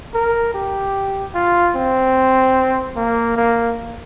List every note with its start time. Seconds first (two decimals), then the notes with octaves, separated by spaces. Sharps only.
0.14 A#4
0.54 G4
1.34 F4
1.75 C4
2.96 A#3
3.37 A#3